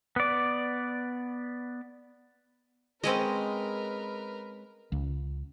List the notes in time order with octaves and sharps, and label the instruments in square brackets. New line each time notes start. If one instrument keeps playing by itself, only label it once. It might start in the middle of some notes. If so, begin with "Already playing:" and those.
[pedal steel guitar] B3 D5
[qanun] G#3 [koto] C4 C#4 D#5 [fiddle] A#4 B4
[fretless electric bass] C#2